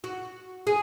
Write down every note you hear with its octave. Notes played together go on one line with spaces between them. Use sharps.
F#4
G#4